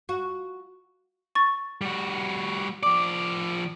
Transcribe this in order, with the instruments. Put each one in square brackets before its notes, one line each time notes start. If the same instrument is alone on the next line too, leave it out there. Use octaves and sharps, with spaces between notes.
[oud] F#4
[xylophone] C#6 A6
[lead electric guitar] G3 F#4
[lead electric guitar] F3 D5 [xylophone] D6